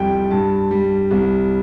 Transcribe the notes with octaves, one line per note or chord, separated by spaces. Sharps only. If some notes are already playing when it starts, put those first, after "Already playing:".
Already playing: C2 F2 G3 G5
G2 A5
G3
C2